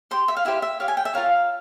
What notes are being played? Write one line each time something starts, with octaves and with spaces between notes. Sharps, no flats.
G4 C5 C6
E5
F5
E4 G4 C5 E5
E5
G4 C#5 F5
G#5
G5
E5
F4 A#4 C#5 F5